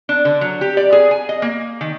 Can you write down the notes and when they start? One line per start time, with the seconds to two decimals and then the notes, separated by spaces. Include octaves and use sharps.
0.09 D4
0.25 D3
0.41 F#3
0.61 G4
0.77 D5
0.92 G#4
1.11 G#5
1.29 D#5
1.42 A#3
1.81 D#3